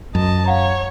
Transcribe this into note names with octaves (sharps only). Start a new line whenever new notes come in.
F#2 D#5 A5
C#5 F5 F#5 A#5